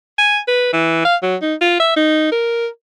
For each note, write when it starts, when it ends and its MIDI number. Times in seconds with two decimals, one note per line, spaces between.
0.18 0.39 80
0.48 0.70 71
0.73 1.01 52
1.05 1.16 77
1.23 1.36 54
1.42 1.55 63
1.61 1.79 65
1.80 1.93 76
1.96 2.29 63
2.32 2.67 70